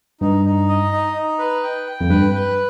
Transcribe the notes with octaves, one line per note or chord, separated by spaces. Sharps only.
G2 D#4
D#4
D#5
D#4
D#4
B4
G5
G5
F2
G2 B4
B4